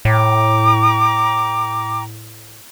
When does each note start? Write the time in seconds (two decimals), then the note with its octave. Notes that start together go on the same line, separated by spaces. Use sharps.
0.05 A2 G5 A#5 D6